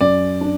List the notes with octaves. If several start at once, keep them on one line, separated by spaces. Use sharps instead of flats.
F#2 D5
D4